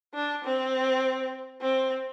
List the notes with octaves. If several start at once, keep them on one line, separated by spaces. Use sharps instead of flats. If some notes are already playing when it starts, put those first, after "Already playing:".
D4
C4
C4